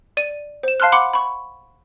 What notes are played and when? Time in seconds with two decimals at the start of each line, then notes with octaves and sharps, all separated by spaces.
0.17 D5 D#7
0.63 C5 E7
0.80 F5 A5 C6 F6 F#6
0.92 F#5 B5 C6 D6 C#7
1.13 B5 C#6